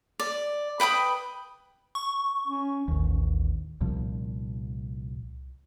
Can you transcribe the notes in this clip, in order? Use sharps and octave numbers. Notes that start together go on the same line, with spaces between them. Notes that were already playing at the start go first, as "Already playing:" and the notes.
D5
B4 G5 B5 D#6
C#6
C#4
A1 D#2
C2 A#2 F3